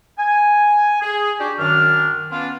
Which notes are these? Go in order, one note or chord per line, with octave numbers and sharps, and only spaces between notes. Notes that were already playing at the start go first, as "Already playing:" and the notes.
G#5
G#4
D4 F#4 G4
F#2 D#3 D4 F6
B3 C#4 D4 F4